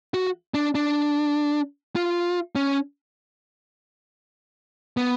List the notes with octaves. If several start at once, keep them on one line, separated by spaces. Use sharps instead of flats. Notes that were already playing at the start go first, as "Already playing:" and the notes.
F#4
D4
D4
F4
C#4
B3